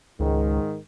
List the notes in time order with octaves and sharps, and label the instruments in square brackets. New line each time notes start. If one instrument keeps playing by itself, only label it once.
[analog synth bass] C#2 [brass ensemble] G#2 D#3